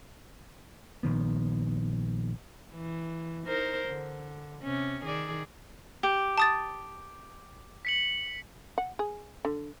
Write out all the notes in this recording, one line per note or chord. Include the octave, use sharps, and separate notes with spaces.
A#1 D#3 B3
E3
D#4 A#4 C5
D3
C3 C#4
D#3 G#4 D5
G4
A5 D#6 A6
B6 C#7 F#7
F#5
G#4
D3